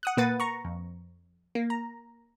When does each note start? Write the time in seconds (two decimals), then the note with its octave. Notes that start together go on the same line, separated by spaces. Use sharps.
0.03 F#5 D#6 F#6
0.17 A#2 A#3 B4 F#5 A6 D#7
0.40 A#5 C#6
0.65 F2
1.55 A#3
1.70 A#5